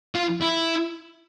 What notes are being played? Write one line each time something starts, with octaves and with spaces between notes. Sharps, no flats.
F4
E4